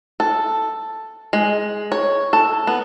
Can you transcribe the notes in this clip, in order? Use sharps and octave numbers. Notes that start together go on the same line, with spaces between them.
A4
G#3
C#5
A4
B3